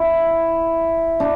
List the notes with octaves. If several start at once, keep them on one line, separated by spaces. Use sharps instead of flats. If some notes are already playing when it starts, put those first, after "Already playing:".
Already playing: E4
D4